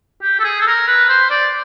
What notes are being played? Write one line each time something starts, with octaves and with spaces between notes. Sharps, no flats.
G4
A4
G#4
A4
A#4
B4
C5
D5